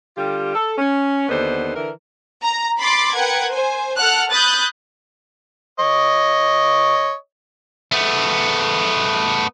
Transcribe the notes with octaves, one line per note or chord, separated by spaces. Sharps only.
D3 G3 F4 G4
A4
C#4
D#2 D3 B3 D#4 C5
D3 E3 A#4
A#5
B5 C6 D6 A6 C7
A#4 B4 F#5 G5 G#6
C5 G#5
A4 F#5 A5 F6 F#6
B5 D#6 F#6 G6 A6
C#5 D#5
A3 B3